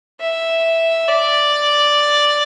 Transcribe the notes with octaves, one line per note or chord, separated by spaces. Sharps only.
E5
D5